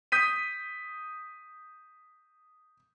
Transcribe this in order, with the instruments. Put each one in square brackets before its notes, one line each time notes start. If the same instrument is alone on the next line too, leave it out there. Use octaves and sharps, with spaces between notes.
[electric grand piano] D#6 G6 B6 D#7